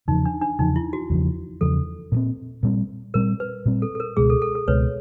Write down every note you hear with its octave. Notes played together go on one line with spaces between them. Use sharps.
E2 C#3 F3 D#4
D4
D4
E2 C#3 F3 D#4
E4
F#4
E2 C#3 F3
E2 C#3 F3 A4
A#2 G3 C4
A#2 G3 C4
A#2 G3 C4 A#4
B4
A#2 G3 C4
A4
A4
A#4
C#2 B2 G#3 G#4
A4
A4
A4
C#2 B2 G#3 B4 C#5